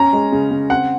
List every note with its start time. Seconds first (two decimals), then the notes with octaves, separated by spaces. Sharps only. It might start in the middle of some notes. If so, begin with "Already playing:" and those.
Already playing: C#4 A#5
0.13 G#3
0.32 C#3
0.51 C#3
0.70 C4 F#5